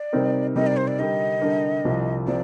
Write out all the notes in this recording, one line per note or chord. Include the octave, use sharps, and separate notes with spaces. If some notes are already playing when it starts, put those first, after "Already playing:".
Already playing: D5
C3 G3 C4 D#4 A#4
C3 G3 C4 D#4 A#4 D#5
D5
C5
D5
D3 G3 D4 G4 A#4 D#5
D3 G3 D4 G4 A#4
C2 C3 F3
C3 F3 D5